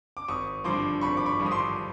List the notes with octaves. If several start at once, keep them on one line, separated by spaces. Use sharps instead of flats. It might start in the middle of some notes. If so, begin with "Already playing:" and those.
D6
G#1 C#6 D#6
G2 D3 F3 C6 D6
G#1 B5 C#6
D6
B5 C#6
G2 D3 F3
D#6
C6 D6